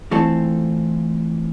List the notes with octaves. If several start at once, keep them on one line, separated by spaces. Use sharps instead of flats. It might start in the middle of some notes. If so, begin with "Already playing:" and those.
E3 A3 C4 F4 A4